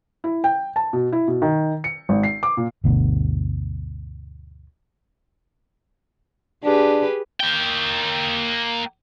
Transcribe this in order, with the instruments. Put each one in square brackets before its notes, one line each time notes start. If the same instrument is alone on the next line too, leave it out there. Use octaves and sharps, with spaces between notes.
[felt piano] E4
G5
A5
B2
E4
B2
D#3
C#7
G#1
C7
D6
A#2
[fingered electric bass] G1 D2 B2
[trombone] D4 [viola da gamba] G4 G#4 B4
[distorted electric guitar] A#3 G5